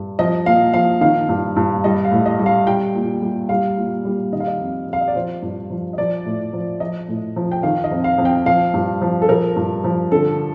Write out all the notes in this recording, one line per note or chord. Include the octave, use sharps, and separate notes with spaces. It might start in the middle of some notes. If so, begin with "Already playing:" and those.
Already playing: G2
F3 D#5
A#2 F5
F3 F5
D#3 F5
G2
G2
G3 D#5
F5
A2
D#5
G3
F5
G3 G5
A#2
G3
G3 F5
A#2
G3
D#3 D#5
F5
D#5
F2
F2
F5
D#5
D5
F3 C5
G2
F3
D#5
F3 D5
A2
F3
F3 D#5
A2
F3
G5
D#3 F5
D#5
F2
F5
F2
G5
F3 F5
G2
F3
A4
F3 A#4
G2
F3
D3 A4